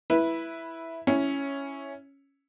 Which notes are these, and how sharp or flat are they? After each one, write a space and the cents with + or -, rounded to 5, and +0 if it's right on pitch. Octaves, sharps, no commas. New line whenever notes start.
E4 +0 B4 -10
C#4 +0 E4 +0